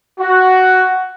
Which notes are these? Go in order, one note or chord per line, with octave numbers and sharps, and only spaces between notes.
F#4